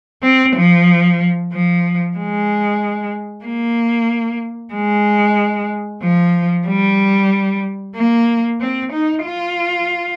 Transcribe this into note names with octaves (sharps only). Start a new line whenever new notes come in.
C4
F3
F3
G#3
A#3
G#3
F3
G3
A#3
C4
D#4
F4